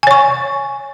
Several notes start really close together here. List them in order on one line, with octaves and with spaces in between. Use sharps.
G#5 C#5 C#6